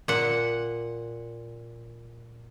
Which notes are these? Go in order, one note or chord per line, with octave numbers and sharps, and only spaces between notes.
A#2 F#5